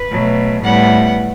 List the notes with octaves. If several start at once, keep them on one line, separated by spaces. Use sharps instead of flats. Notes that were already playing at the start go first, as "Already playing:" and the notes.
Already playing: B4
B2 F#3 A3
A2 G3 B3 F#5